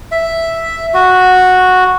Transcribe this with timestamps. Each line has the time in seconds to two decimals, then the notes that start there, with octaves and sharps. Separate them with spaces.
0.12 E5
0.94 F#4